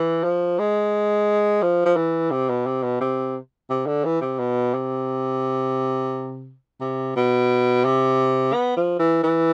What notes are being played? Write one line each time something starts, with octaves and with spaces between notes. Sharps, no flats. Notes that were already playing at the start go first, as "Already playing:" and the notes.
Already playing: E3
F3
G#3
F3
F3
E3
C3
B2
C3
B2
C3
C3
D3
E3
C3
B2
C3
C3
B2
C3
B3
F3
E3
E3